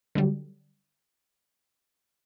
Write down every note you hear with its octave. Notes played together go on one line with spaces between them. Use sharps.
D3 F#3 G3